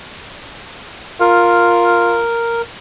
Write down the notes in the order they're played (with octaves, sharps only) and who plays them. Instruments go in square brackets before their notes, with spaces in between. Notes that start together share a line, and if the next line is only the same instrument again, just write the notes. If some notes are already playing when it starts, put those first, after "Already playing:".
[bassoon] F4 [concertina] A#4